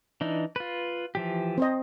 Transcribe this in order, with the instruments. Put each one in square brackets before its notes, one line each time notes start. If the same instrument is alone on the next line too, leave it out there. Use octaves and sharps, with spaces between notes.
[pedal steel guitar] E3 D4 D#4
F4 B4
E3 F3 G4
[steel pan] C4 C5 D#5